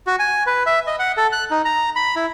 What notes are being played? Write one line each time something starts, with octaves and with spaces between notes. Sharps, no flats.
F#4
G#5
B4
E5
D#5
F#5
A4
F#6
D#4
A#5
B5
E4